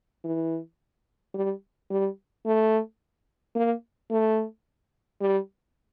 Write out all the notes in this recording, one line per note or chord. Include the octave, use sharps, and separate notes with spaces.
E3
G3
G3
A3
A#3
A3
G3